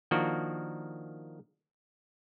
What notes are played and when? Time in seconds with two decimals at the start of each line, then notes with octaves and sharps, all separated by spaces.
0.11 D#3 F3 A#3 D4 F#4